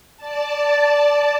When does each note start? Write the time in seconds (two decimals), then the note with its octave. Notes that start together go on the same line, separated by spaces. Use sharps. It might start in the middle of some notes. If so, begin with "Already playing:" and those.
0.17 D5 A5